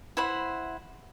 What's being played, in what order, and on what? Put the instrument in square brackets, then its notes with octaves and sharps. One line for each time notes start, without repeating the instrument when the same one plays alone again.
[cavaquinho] E4 C5 F#5 B5